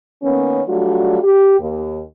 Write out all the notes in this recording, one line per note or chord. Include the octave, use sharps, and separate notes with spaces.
D#3 A#3 B3 C#4
F#3 G3 A3 D4 F4 F#4
G4
D#2